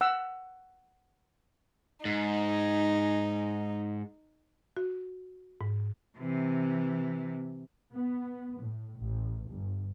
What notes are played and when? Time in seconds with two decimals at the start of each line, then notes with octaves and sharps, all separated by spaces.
0.01 F#5 E6
2.05 G#2 D#4
4.77 F#4
5.61 G#2
6.18 C3 E3
7.92 B3
8.60 A2
8.99 A1
9.49 G1